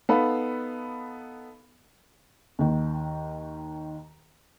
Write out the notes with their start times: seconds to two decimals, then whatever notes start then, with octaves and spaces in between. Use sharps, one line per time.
0.09 B3 D#4 A4 B4 F5 B5
2.59 D#2 D#3